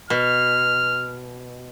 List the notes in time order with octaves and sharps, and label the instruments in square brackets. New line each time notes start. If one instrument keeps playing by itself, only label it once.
[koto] B2 [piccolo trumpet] F6